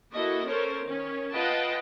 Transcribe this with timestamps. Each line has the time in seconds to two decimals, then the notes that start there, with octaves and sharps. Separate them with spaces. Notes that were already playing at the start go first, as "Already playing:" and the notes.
0.13 A#3 E4 F#4 A4 D#5
0.46 C#4 A4 A#4 C5 C#5
0.83 D#3 C#4
1.33 F4 B4 D#5 F#5 G5 A5